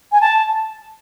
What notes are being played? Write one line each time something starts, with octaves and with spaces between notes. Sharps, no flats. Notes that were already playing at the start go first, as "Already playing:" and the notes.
G#5
A5